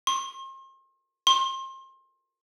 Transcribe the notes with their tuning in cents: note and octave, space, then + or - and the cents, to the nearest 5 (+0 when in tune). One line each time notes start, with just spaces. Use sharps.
C6 +40
C6 +30